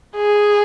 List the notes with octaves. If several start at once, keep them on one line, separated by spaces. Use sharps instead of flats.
G#4